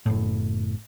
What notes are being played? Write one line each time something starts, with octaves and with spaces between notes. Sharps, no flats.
F#1 A2